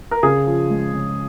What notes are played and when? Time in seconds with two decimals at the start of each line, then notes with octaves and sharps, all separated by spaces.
0.11 A#4
0.23 C#3 G#4
0.47 F3
0.70 G#3
0.93 C#3